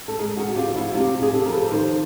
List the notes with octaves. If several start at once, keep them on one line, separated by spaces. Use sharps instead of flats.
A4
G#3 G#4 A#4
F#4 G#4
C3
F4 G4
F3
E4 F#4
C3 F4 G4
C3 G#4
G4 A4
F3 A#4
A4 B4
D#3 A#4 C5